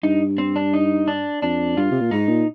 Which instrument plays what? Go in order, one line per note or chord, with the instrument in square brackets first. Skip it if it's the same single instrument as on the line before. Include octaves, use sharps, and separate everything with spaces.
[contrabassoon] G2 [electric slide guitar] D#4
[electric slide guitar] C4
D4
D#4
D4
[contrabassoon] F2 [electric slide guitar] D4
[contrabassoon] G2 [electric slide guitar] F4
[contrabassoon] C3
A#2
[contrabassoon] G#2 [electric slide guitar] D#4
[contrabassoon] A#2